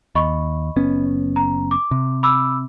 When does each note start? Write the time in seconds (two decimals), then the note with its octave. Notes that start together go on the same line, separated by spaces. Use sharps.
0.15 D#2 D#5 B5 C#6
0.76 F#1 B3 C#4
1.36 A#5
1.71 D6
1.91 C3
2.23 B5 D6 E6